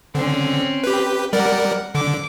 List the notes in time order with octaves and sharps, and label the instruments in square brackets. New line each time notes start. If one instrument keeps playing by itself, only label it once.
[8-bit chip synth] D3 [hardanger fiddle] C4 C#4
[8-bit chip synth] G4 B4
[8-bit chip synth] G3 A#4 D5 [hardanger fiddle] F#5
[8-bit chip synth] D3 [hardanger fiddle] D6